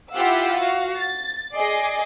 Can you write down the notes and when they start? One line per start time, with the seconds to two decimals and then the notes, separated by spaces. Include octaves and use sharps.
0.12 E4 F4 G4 F5 F#5 E6
0.58 F#4 F5
0.97 A6
1.55 G#4 D5 D#5 G#5 D6 C7